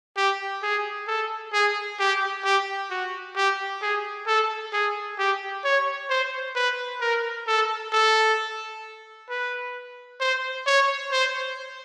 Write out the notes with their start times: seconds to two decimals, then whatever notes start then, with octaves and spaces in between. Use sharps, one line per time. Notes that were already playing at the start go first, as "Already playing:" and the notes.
0.17 G4
0.63 G#4
1.07 A4
1.53 G#4
2.00 G4
2.44 G4
2.90 F#4
3.36 G4
3.82 G#4
4.27 A4
4.73 G#4
5.19 G4
5.64 C#5
6.10 C5
6.55 B4
7.01 A#4
7.47 A4
7.92 A4
9.29 B4
10.20 C5
10.66 C#5
11.12 C5